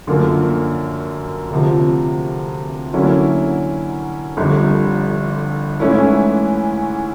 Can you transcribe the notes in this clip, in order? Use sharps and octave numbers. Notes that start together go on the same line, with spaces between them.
F#2 D3 F3 A#3
D2 C3 F3
D3 F#3 A#3 C#4 E4
G1 F2 D3 G3
G#2 E3 A3 C#4 E4